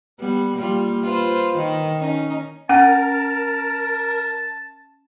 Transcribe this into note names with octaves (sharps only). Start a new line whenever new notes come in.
G3 B3
G3 A#3 F4
F4 B4 C5
D#3
C#4 D#4
C#4 A#4 F#5 A5